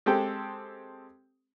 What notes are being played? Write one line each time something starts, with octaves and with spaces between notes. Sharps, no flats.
G#3 C4 G4 A4 G5